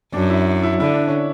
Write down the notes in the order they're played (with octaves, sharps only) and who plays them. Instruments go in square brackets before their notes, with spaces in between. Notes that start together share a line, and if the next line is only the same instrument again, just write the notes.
[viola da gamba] F#2 [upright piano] D4
[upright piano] E4
E4
[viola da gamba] D3 [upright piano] E4
[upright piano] D4
C#4